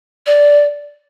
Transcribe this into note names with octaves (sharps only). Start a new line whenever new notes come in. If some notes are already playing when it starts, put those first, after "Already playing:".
D5